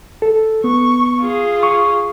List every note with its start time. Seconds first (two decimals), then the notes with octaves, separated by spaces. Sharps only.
0.22 A4
0.64 B3 C#6
1.21 F4 G#4
1.63 C#6